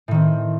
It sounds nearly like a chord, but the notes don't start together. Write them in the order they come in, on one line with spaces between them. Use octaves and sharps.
A2 D#3 C4